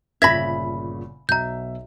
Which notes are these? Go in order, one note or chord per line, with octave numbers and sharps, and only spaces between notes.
G1 A#2 C#3 E5 B5 G#6 A#6 B6
B1 B2 E5 A#5 G6